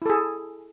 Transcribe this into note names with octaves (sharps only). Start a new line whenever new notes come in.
E4 G#4 A4